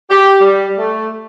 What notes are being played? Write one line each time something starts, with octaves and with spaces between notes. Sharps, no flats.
G4
G3
A3